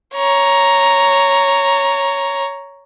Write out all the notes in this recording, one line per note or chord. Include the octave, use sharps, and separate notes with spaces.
C#5 A#5